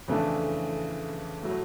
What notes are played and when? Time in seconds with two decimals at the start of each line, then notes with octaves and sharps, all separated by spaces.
0.08 F2 C#3 E3 A3 D4
1.43 A2 F#3 A3